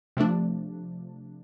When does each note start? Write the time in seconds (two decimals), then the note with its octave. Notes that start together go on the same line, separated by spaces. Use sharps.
0.17 C3 F3 A3 D4